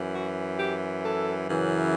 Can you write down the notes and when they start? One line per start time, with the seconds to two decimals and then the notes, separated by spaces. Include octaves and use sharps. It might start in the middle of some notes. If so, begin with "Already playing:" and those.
Already playing: F#2 E3
0.13 F#4
0.59 G4
1.04 A4
1.49 F#2 C#3 E3